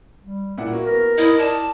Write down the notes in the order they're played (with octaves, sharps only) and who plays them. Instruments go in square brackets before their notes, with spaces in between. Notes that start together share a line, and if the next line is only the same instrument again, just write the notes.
[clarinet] G3
[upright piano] A#2 E4 F#5
[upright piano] A#3 [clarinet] F#4
[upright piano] B3 [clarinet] A#4
[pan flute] E4 [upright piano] D#5 D#6
[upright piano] D5 [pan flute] A5